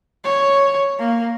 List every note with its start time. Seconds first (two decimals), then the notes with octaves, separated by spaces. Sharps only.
0.24 C#5
0.99 A#3